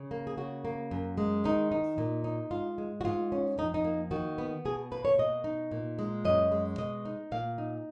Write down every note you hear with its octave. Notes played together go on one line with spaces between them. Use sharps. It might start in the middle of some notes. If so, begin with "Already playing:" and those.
Already playing: C#3
A#3
G#4
C#3 F#4
A#3
F#2
G#3
D#3 D#4
D#4
A#2
D#4
G#2 F4
G#3
F#4
G#2 F4
C#4
F2 D#4
D#4
A#3
D#3 F#4
B3
B2 G#4
A#3 B4
C#5
B2 D#5
D#4
A#2
G#3
F#2 D#5
G#3
B2 D#5
D#4
A#2 F5
D#4